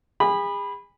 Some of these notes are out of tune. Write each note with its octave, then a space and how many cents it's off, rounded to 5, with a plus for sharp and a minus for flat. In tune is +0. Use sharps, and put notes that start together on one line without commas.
G#4 -40 B5 -5